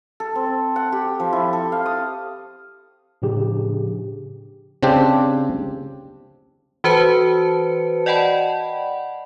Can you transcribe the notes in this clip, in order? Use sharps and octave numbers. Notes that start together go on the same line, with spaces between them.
A4
C4
F#5
G4
F3
E4
A4
F5
D#6
A2 C#3 F3 D4 G4 G#4
C#3 C4 D4 G4
E3 F#4 B4 C5 A5 C#7
D5 D#5 F#5 G5 A5 B5